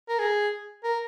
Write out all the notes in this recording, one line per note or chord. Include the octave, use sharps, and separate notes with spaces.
A#4
G#4
A#4